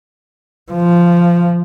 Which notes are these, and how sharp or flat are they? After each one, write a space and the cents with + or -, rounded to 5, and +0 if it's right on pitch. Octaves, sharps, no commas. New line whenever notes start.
F3 -10